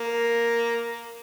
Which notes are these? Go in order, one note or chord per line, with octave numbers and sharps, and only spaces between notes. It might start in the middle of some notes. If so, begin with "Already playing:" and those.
Already playing: A#3